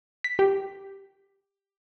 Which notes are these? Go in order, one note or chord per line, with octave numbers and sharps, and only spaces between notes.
B6
G4